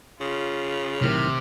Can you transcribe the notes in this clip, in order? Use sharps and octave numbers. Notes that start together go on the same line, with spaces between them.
C#3 F4
B1 A2 C3 D#3 F6